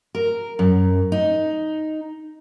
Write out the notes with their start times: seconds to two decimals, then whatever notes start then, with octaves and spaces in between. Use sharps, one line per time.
0.15 A#4
0.59 F#2
1.12 D#4